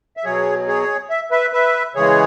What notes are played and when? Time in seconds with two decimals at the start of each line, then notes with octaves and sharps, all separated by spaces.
0.17 E5
0.25 B2 F#3 G#4 C#5
0.67 G#4 C#5
1.10 E5
1.31 B4 E5
1.53 B4 E5
1.95 C#3 E3 G#3 G#4 C#5